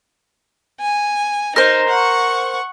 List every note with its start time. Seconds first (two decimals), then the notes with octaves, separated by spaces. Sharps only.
0.81 G#5
1.56 D#4 A#4 C5
1.89 F#5 C#6